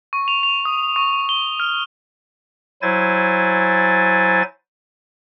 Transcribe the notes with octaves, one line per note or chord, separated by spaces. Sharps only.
C#6
F7
F7
D#6
C#6
G7
F6
F#3 E4 C5 G#5 A6